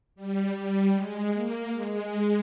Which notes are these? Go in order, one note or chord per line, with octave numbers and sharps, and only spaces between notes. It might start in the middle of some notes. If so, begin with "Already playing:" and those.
G3
G3
G#3
A#3
G#3